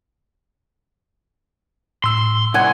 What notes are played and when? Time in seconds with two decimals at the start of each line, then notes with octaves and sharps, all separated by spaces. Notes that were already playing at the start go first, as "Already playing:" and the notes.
2.04 A2 C6 E6
2.54 C2 F#5 G#5